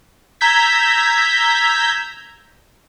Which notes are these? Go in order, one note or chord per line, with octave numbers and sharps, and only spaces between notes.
A#5 E6 G6 G#6 B6